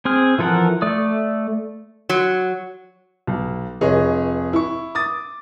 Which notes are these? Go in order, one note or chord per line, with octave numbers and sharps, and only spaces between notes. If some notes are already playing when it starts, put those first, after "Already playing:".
C4 G#4 F6
E3 F3 A4 A#4 F#5
A3 D5 D#6
F#3
B1
F1 G#4 C#5 D#5
E4 C#6
D6 D#6 A6